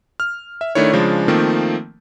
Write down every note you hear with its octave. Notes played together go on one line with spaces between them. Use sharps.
F6
E5
D#3 A3 D4 E4 C#5
C#3 F3 G#3 D4
D#3 F3 A3 A#3 C4